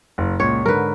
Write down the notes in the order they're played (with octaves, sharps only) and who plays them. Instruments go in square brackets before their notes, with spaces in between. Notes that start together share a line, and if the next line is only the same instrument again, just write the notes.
[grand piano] F#1
[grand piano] C#2 A#2 [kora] C#5
[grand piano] G#2 D3 [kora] A#4 B4